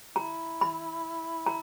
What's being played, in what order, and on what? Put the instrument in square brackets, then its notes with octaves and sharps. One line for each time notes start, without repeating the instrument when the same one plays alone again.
[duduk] E4 [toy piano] A#5
[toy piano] B5
A#5